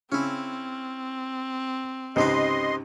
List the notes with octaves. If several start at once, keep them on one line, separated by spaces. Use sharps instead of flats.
C#3 C4 C#4 E4
C#2 G#2 C3 G4 B4 D#5 C6